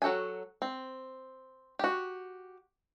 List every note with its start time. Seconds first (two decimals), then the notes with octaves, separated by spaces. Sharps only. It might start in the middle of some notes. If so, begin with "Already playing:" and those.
0.02 F#3 F#4 A4 G5 G#5
0.62 C4
1.79 F#4 G4